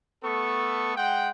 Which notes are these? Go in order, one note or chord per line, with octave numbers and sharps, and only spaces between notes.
A3 B3 A4 C#6
G#3 F#5 G5